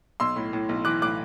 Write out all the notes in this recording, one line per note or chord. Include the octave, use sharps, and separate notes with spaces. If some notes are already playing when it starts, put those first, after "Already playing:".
B1 C6 E6
A2
A2
B1
E3 D6 F#6
A2 D6 F#6